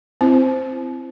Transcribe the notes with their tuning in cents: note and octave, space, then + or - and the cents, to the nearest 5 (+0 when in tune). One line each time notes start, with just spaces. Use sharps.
C4 +0 E4 +30 C5 -5